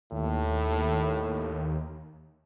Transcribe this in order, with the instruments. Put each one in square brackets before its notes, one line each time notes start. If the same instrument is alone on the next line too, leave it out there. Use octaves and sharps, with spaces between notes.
[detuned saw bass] D#2 [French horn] A2